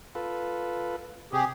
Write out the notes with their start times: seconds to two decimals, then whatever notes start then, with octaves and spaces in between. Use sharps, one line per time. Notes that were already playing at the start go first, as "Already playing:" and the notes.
0.15 F4 A4 B4
1.33 C3 G4 G#4